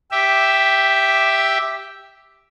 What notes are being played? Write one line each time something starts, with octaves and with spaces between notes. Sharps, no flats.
G4 E5